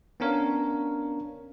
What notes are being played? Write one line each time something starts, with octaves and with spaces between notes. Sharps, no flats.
B3 C#4 D4 A#4 C#5 F5